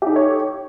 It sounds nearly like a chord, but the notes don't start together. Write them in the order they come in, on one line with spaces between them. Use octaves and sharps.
G4 D#4 A4 C#5